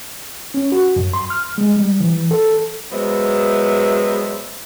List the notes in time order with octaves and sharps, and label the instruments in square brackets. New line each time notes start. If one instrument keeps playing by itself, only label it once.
[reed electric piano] C#4
F#4
F#2
C6
F6
G#3
G3
E3
A4
[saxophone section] F#3 G#3 B3 C5 E5